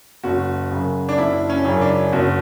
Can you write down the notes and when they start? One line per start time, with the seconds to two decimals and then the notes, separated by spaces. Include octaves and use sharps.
0.23 F#1 F#4
0.71 F#2 C#3
1.09 D4
1.18 F#1 E4
1.50 C#4
1.65 F#2 C#3
1.81 D4
2.12 F#1 F#4